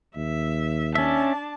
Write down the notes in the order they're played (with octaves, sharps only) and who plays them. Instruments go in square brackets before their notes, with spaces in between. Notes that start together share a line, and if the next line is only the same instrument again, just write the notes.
[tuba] D#2 [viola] E5
[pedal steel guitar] C#4 E5 [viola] D4 A5